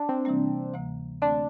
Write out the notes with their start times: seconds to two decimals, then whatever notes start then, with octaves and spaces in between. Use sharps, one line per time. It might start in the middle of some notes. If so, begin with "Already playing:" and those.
Already playing: D4
0.09 C4
0.25 C3 E3 G3 A#3
0.74 D2 C3 E3 A#3
1.22 D3 A3 C4 D4